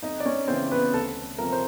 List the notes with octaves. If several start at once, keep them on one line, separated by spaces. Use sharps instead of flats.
F2 D#4 D#5
D5
C#4 C#5
C#3 E3 C4 C5
B3 B4
D2 A4
C3 F3 A3 C4 A#4
C5